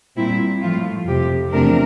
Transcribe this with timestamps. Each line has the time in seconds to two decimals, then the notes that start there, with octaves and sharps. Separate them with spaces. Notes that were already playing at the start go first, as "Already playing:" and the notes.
0.16 A#2 G3 C4 E4
0.61 A2 F3 A3 F4
1.06 F2 C3 F3 G4
1.51 E2 C3 F3 A3 D4 A#4